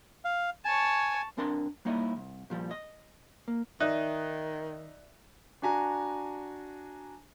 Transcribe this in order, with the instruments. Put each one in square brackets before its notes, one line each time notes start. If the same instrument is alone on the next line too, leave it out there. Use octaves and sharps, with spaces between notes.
[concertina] F5
[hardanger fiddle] C#5 A5 [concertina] G#5
[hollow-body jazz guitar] C2 C4 D4 A#4 A5 C6
G3 A#3 D#4 E4 C#5 D#5
C2
A#2 F3 G3
D#5
A#3
[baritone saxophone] D#3 [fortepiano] D#4 [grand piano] D5 E5 F#6
[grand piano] D4 F#4 G#5 A#5